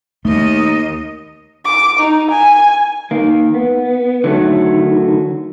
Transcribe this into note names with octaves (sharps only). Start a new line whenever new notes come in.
D#2 A3 D#4 D#5
D6
D#4
G#5
D#3 A#3
B3
D3 D#3 F#3 A3